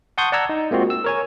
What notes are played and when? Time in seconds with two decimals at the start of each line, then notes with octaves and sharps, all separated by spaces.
0.18 F#5 A5 C6 C#6 D#6 G6
0.32 D5 F#5 A5 A#5 E6 G#6
0.49 D#4
0.71 G#3 A#3 C4 F4 F#4
0.90 E6
1.04 A#4 C#5 G#5